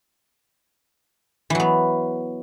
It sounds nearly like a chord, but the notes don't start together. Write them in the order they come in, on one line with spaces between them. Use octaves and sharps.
E3 F#3 B3